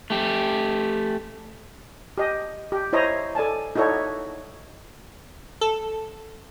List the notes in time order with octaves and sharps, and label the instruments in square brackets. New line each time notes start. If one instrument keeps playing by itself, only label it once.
[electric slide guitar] A3 G4
[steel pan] G4 D#5
G4
E4 C5 C#5 D#5 A#5
A4 D5 G#5 A5
D#4 E4 F#4 A4 C#5 D5
[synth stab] A4